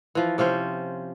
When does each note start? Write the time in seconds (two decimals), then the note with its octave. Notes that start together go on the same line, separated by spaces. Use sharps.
0.15 E3 F3
0.38 C3 F3 C#4 C5